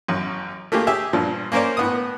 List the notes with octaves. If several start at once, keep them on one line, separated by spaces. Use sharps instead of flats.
A1 F#2
A3 A#3 F4 G4 G#4
G4 G#4 E5
G2 A#2 F3
A#3 C#4 A#4 C5 D5
A2 B3 D#6